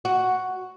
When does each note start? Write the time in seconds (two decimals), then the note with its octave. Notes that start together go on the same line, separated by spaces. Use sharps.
0.05 F#4